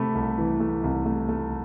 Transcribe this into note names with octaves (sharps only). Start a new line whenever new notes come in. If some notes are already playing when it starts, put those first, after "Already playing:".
Already playing: C3 A3 B5
C2
E3
A3
C2
A3
A3